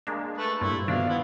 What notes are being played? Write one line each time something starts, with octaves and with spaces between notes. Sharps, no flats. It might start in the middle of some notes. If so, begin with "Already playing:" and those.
G#3 A#3 D4
A3 B4 A5
G2 A#2 A3 E4 C5
B2 D#3 F3 D4 F5
B3 E4